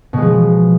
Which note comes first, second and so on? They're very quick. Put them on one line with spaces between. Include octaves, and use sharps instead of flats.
B2 G#3 F3